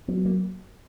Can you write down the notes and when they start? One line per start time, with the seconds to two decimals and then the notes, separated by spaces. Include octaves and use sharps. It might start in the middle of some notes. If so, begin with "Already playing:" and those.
0.08 F#3 B3
0.25 A#3